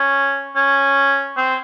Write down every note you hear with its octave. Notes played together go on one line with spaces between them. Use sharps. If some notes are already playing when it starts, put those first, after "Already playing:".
Already playing: C#4
C#4
C4